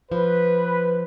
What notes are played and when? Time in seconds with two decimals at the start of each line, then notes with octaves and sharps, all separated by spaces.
0.12 F3 B4